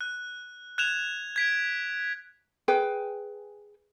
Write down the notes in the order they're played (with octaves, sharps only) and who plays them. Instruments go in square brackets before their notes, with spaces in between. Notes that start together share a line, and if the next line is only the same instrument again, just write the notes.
[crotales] F#6
F#6 G#6 E7 F7
G#6 B6 D7
[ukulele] G#4 B4 G5